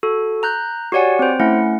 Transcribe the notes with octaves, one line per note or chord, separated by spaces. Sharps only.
F#4 A4
A#5 F#6 G6
F#4 G4 C#5 D5 F#5 G#5
C4 C5
A3 C#4 E4 F#5